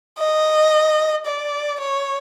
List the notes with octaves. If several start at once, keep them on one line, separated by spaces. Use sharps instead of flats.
D#5
D5
C#5